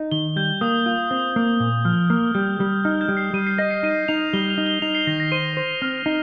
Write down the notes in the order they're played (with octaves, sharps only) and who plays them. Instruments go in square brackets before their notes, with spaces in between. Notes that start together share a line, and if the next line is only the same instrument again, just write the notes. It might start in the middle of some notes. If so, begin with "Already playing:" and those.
Already playing: [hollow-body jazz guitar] D#4
[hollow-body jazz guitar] D#3 [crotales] G7
[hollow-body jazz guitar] G3 [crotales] G6
[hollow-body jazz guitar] A#3 [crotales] D#6
[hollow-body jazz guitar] F4
C4
A#3
A#2
[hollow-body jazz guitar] F3 [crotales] F6
[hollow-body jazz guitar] A#3 [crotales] F6
[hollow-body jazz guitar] G3 [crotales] G6
[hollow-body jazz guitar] G3
[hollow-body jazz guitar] D#4 [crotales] F6
[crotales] G6
[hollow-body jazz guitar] G3
[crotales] C7
[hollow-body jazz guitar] G3 [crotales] D#7
[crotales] C7
[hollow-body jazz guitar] D#5 [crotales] A#6
[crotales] C7
[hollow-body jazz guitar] D#4 [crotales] D#7
[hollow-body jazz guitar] D#4 [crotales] F7
[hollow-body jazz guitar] G3 [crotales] G7
[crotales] F7
[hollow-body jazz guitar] D#4
[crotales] G7
[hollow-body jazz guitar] D#4 [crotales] F7
[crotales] C7
[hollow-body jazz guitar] D#3 [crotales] A#6
[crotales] A#6
[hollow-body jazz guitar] C5 [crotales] D#7
[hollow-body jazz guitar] C5
[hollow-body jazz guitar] C4 [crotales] F6
[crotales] F6
[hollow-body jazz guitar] D#4